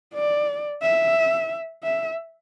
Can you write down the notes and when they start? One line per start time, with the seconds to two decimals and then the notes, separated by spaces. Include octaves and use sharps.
0.14 D5
0.83 E5
1.83 E5